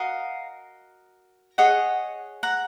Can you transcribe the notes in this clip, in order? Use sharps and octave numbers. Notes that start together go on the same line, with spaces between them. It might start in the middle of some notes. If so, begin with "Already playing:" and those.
Already playing: F#4 A#4 D#5 F5
G#4 C#5 D#5 F#5
F#5 A#5